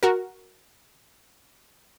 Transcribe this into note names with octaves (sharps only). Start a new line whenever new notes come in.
F#4 A#4